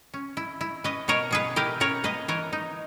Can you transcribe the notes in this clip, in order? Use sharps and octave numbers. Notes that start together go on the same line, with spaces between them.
C#4
E4
E4
C#4 B4 D#5
B2 A#4 C#5
B2 G#4 B4
E4 G4 A#4
C#4 A#4 C#5
A#3 B4 D#5
E3 A#4 C#5
D#4